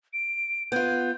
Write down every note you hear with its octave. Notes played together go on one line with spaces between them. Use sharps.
D7
B3 F4 G6